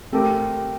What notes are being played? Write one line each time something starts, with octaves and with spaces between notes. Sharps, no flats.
A3 C4 G4 A#4